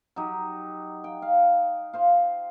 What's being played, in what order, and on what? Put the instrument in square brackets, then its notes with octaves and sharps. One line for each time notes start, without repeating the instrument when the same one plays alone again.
[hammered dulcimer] F#3 D#4 G4
G5
F5
F4 C5 F5